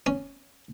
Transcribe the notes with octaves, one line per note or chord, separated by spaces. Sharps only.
C#4